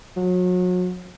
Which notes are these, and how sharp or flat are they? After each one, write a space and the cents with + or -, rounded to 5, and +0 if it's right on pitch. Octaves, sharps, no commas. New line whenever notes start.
F#3 -35